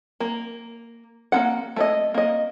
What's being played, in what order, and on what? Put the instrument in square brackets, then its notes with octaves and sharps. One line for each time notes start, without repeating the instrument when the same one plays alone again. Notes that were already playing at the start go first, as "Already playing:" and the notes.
[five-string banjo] A#3
A#3 D#4 F#5
A3 C5 D#5
A#3 D#5